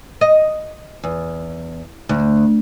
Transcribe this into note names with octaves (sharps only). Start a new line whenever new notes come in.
D#5
E2
D2